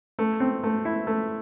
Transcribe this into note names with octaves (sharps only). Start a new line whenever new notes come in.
A3
C4
A3
E4
A3